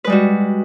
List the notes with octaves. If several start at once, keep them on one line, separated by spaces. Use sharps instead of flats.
G3 G#3 F#4 B4